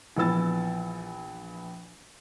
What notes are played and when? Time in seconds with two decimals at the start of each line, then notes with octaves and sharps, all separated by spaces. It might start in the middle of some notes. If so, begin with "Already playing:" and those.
0.17 A#1 E3 B3 E6 A6